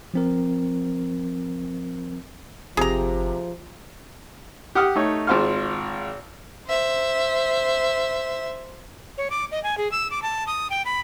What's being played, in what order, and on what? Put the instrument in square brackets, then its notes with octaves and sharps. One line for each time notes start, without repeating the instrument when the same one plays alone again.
[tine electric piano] F3 C4 A#4
[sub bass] G1 [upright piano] C3 G4 [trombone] F3 [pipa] G#4 A#5
[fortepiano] G4 F#5 D#6 F6
A3 D#4 C#5
G#1 F4 C5 F5 C#6 F6
[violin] C5 E5
[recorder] C#5
D6
D#5
G#5
G#4
E6
D6
A5
D#6
G5
B5